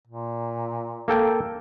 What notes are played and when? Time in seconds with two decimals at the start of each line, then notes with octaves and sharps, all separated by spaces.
0.07 A#2
1.08 A#3 A4 G5